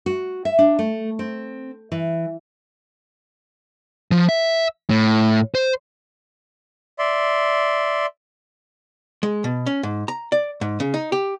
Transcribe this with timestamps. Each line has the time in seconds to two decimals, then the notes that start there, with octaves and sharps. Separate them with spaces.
0.06 F#4
0.45 E5
0.59 D4
0.79 A3
1.19 C4
1.92 E3
4.11 F3
4.29 E5
4.90 A2
5.55 C5
6.99 D5 E5 C6
9.23 G#3
9.44 B2
9.66 C#4
9.83 G#2
10.08 A#5
10.32 D5
10.61 G#2
10.80 C#3
10.94 D#4
11.12 G4